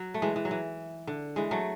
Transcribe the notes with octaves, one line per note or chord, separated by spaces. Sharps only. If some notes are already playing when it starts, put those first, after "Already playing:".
Already playing: F#3
A3
E3 G#3
E3
F#3
E3
D3
E3 G#3
F#3 A3